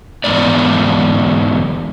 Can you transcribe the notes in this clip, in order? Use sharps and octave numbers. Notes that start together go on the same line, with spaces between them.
E2 G#2 C#3 G#3 B3 D5